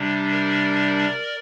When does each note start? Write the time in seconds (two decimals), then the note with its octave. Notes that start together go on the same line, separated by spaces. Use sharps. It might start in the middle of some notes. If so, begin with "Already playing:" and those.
Already playing: C3 G3 D4
0.31 A#4 D5